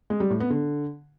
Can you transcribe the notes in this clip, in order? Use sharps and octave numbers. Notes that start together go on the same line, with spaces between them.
G#3
G3
A2
B3
D3